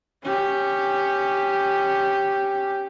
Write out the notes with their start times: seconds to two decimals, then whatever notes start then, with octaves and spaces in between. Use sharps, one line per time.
0.23 C#4 G4